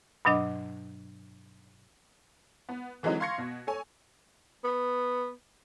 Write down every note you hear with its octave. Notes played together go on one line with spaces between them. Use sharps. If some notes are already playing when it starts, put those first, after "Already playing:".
G2 B2 F#3 D4 D#5
B3
D3 E3 F#3 G#3 C4 D#4
F5 C6 C#6 G#6 A#6 C#7
B2
A4 C#5 G#5
B3